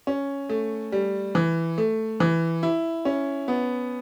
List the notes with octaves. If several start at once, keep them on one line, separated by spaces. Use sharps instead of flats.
C#4
A3
G3
E3
A3
E3
E4
C#4
B3